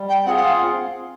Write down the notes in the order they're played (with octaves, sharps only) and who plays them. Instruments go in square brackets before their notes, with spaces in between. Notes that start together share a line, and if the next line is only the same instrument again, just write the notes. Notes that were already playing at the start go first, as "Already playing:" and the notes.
Already playing: [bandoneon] G3
[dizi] G5
[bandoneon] C4 F4 G#4 [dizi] F#5
[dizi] F#5
F5